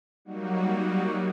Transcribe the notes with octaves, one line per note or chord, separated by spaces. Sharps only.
F#3 G3 A#3 D#4 F#4